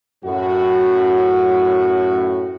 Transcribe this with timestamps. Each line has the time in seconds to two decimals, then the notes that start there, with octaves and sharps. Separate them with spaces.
0.24 F#2 A2 F#4